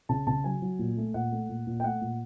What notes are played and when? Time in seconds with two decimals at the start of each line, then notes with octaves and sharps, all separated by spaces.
0.09 C#3 A5
0.27 C#3 A5
0.44 F#3 G#5
0.62 F#3
0.79 A#2
0.97 A3
1.14 A#2 F#5
1.32 A3
1.49 A#2
1.67 A#2
1.80 G5
1.84 A3 F#5
2.01 A#2